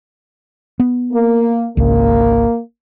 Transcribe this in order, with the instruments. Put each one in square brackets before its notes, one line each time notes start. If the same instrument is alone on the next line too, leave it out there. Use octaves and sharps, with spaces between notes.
[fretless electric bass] B3
[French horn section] A#3
[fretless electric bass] G#1 C#2 [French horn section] A#3